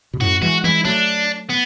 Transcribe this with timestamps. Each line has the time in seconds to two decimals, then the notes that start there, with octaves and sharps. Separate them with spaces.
0.13 B2
0.20 F#2 A2 F#4
0.42 E3 G#3 F#4
0.64 E3 G#3 E4
0.85 F#3 A3 D4
1.50 B3